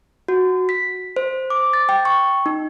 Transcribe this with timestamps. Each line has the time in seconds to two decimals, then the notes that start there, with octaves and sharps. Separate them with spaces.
0.28 F#4
0.69 B6
1.16 C5
1.50 D6
1.73 A6
1.89 G5
2.05 C#6
2.46 D#4